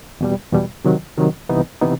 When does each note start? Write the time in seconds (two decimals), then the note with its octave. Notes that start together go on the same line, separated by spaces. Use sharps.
0.21 E2 B2 G3
0.53 E2 B2 G3
0.85 C3 D#3 F#3
1.17 C3 D#3 F#3
1.49 C2 C3 E3 B3 D#4
1.81 C3 E3 B3 D#4